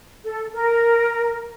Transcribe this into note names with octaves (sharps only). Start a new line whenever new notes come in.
A4
A#4